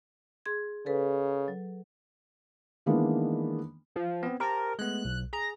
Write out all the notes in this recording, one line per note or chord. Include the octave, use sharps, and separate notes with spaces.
G#4 C6 G#6
C#3 A4 B4
F#3
D#3 E3 G#3 A#3 B3 D4
F3
B3 C4
G4 A#4 C5 A5
G#3 A3 B3 F#6
B1
G#4 A#5